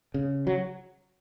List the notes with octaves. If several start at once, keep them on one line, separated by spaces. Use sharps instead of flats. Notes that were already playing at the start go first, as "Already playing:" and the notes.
C#3
F#3